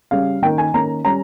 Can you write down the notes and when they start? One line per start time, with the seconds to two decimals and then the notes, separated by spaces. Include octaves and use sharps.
0.11 C#3 G3 C#4 F5
0.42 D#3 A#3 C#4 G5
0.58 G#5
0.74 D#3 A#3 C#4 A#5
1.05 G3 C#4 A#5